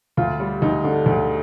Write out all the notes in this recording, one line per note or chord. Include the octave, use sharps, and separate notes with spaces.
D2 F4
G3
D2 D#4
D3
D2